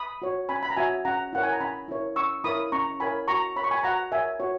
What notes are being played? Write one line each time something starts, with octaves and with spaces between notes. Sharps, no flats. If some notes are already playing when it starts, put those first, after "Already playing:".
Already playing: B5 D#6
F#4 C#5
C#4 G#5 B5
B5
A#5
F#4 C#5 E5 G#5
C#4 F#5 A#5
E4 A#4 C#5 F#5
G#5
A#5
C#4 G#5 B5
E4 A#4 C#5
C#4 C#6 E6
E4 A#4 C#5 B5 D#6
C#4 A#5 C#6
E4 A#4 C#5 G#5 B5
F#4 A#5 C#6
A#4 C#5 B5
C#6
G#5 B5
F#4 F#5 A#5
A#4 C#5 E5 G#5
F#4 C#5